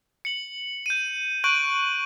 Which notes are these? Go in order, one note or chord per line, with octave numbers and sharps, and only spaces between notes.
C#7 F#7
G6 D#7
C#6 F#6 G6 D7 D#7 F#7